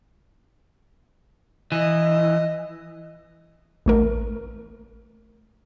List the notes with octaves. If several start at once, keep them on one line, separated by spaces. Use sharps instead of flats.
E3 D#5
A1 A3 A#4